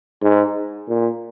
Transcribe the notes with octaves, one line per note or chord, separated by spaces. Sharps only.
G#2
A#2